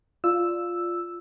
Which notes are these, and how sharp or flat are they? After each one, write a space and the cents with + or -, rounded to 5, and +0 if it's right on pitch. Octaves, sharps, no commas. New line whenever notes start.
F4 +0 D5 +0 E6 +0